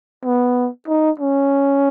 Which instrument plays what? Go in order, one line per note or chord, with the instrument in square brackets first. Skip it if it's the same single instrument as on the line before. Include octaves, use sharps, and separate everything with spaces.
[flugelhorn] B3
D#4
C#4